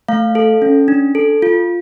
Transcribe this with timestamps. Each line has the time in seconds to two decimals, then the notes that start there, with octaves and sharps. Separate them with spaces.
0.08 A3 F5
0.35 A4
0.62 C#4
0.88 D4
1.15 A4
1.42 F4